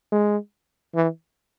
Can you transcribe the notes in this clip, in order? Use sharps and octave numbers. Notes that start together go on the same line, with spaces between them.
G#3
E3